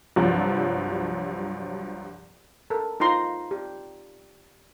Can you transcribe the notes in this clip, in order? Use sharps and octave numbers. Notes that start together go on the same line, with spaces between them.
C2 G2 F3 F#3
A4 A#4
D#4 F4 A#5 C6
G4